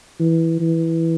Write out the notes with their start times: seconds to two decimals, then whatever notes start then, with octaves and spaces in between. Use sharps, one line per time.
0.20 E3
0.60 E3